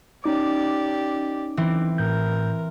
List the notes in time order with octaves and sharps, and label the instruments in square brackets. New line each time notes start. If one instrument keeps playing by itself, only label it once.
[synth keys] C#4 D#4 D6 [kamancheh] G4 D5
[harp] E3 C4
[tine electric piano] A2 G6 [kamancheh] A#4